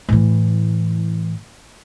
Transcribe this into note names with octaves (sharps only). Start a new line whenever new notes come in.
A2 E3